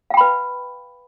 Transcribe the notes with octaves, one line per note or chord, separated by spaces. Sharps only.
B4 F5 G5 B5